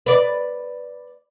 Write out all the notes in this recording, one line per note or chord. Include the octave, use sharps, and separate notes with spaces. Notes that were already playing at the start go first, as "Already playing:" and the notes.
B4 D5